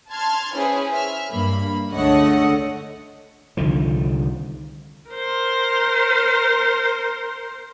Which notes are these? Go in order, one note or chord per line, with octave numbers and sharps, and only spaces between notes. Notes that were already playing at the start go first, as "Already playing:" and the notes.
A5 C6 F6 G#6
C#4 E4 G#4 B4 C5
E5 F6
G2 A#3 B5
C#2 D3 A3 C#5 D#5 F#5
C2 D3 D#3 F3
A#4 C5